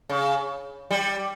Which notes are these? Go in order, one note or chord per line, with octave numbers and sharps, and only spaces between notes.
C#3
G3